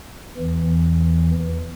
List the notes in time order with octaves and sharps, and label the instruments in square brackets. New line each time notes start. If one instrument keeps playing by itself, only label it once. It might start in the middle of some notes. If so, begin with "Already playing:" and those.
[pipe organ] E2 E3